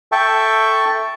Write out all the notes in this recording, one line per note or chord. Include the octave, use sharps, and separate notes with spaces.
A4 E5 G5 A5 C#6